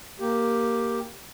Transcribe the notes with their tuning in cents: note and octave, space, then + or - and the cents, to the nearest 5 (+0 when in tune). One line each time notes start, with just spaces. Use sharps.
A#3 +0 G4 +0